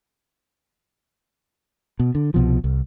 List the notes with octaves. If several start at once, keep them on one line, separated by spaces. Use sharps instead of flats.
B2
D3
C2 B2 F3
C2